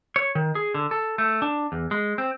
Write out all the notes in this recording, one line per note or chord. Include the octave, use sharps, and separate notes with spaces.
C#5
D#3
G#4
D3
A4
A3
D4
E2
G#3
C4